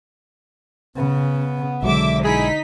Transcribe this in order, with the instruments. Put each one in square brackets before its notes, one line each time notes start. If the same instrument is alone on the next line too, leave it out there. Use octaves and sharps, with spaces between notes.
[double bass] C#3 [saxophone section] B3
[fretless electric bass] B1 F#3 G#3 [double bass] D3 [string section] E5 D6
[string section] D#4 B6 [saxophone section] E4 G#4